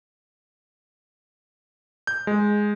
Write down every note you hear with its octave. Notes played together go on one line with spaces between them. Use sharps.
G6
G#3